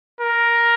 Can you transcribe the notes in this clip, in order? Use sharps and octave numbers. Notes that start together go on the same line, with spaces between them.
A#4